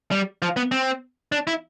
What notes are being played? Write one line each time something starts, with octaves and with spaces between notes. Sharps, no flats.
G3
F3
B3
C4
D4
E4